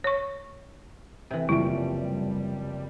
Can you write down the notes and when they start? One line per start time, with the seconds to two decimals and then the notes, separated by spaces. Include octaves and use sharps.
0.04 C#5 C#6
1.31 C3 E3
1.49 F#1 F3 G3 E4 D7